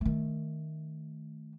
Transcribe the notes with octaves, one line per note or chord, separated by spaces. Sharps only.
D#3 A3